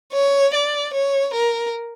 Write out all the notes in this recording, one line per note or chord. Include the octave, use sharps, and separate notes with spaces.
C#5
D5
C#5
A#4